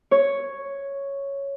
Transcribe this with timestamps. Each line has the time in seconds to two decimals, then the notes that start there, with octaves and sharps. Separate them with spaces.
0.11 C#5